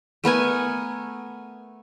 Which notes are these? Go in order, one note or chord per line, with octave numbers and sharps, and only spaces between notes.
A3 B3 A#4 G#5